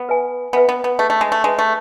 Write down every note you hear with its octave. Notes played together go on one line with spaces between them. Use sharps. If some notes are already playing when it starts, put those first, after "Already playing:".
Already playing: B3
B4 E5 G#5
B3 B4 E5 G#5
B3
B3
A3 G#4 B4 E5
A3
G#3
A3
G#3 G#4 B4 E5
A3